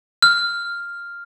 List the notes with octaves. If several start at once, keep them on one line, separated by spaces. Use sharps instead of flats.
F6